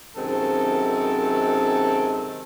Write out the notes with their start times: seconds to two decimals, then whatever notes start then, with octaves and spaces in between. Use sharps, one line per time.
0.16 F#2 C3 D#3 G#3 C4 A4